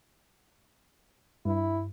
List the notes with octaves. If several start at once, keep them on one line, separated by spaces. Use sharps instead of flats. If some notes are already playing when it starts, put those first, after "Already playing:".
G2 E4